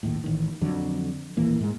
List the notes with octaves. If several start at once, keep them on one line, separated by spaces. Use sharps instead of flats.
A#1 D#2 A2
A1 D#3
F2 D3 F#3
D#1 A1 E3 A#3
G#2 G#3